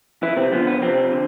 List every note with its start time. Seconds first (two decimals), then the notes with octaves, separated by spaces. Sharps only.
0.22 F2 E3 E4
0.36 C3 C4
0.52 D3 F3 B3
0.67 B3
0.81 F2 C3 C4
1.12 D3